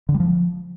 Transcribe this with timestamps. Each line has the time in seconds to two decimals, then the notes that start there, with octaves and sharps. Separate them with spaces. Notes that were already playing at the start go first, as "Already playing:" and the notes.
0.09 D3
0.14 G3
0.20 F3